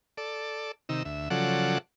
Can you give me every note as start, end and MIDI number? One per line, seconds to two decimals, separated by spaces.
0.17 0.72 69
0.17 0.72 74
0.89 1.03 48
0.89 1.03 51
0.89 1.03 63
0.89 1.03 88
1.05 1.29 38
1.05 1.29 76
1.30 1.78 49
1.30 1.78 53
1.30 1.78 54
1.30 1.78 69
1.30 1.78 74
1.30 1.78 78